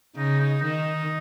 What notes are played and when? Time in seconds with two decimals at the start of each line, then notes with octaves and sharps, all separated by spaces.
0.16 C#3 D#4
0.40 D#4
0.62 D#3 D#4